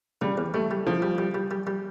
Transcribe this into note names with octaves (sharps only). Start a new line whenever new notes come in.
C#3 G3
E2
G3 A3
G3
C#3 F3
G3
G3
G3
G3
G3